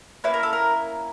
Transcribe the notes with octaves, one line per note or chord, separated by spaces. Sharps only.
A#3 C#4 E4 B4
A#4
A4
A#4